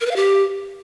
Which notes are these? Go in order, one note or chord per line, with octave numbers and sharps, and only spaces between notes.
A#4
B4
F5
G4